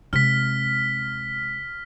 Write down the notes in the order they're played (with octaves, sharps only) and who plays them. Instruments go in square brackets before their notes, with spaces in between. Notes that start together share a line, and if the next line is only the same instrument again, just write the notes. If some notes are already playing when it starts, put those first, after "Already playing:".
[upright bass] C3 G#3 [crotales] F6 B6